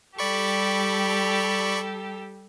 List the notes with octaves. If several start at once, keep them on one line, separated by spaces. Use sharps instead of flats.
G3 G4 A4 D5 B5 C#6